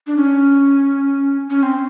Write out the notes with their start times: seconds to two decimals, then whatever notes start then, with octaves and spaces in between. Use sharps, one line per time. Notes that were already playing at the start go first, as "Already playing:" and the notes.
0.07 D4
0.16 C#4
1.50 C#4
1.63 C4